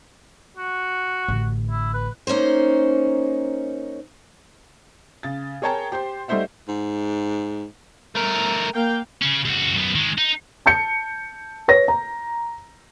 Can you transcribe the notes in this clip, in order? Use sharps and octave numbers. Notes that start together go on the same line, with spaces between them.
F#4
A1 D3
E4
B4
A#3 C#4 D#4 C5
C#3 A6
G#4 A#4 C#5 G5 A5 A#5
G4 C5 C6
G3 A3 D#4 C5 E5 F#5
G#2
A3 A#4
A#3 F5 G5
C#3 C#4
C#2 F#4
F#2 B3
D#3 G#3
D#4
A5 G6 C#7
B4 C#5 A#6
A#5